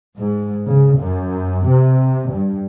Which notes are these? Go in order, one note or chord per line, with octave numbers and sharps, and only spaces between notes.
G#2
C#3
F#2
C3
G2